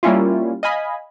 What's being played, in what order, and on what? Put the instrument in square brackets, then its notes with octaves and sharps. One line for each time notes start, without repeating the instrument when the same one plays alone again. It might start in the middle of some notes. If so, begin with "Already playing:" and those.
[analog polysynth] G3 A#3 C#4 E4 F4
D#5 F5 G#5 B5